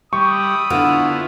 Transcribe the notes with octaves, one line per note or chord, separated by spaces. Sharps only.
G3 E5 B5 C#6 D#6
D3 B3 E4 F4